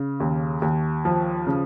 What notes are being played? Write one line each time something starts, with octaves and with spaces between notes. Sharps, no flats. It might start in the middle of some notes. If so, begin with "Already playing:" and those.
Already playing: C#3
D#2
D#2
F3
C#3